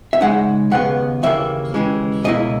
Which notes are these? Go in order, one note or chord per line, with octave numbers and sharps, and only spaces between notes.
E5
C#3 E3 G#3 D#4 F#5
D#2 C#3 B3 F#5
D#2 C#3 E3 A#3 E5
D#2 C#3 E3 G#3
C#2 B2 A#3 E4 D#5